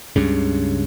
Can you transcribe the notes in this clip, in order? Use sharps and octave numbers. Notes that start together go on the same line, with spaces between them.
C#2 G2 C#3